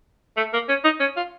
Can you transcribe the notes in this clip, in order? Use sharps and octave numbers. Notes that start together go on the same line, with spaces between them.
A3
A#3
C#4
D#4
C#4
F4